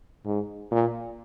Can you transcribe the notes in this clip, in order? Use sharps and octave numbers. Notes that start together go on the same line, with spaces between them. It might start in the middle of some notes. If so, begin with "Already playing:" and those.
G#2
A#2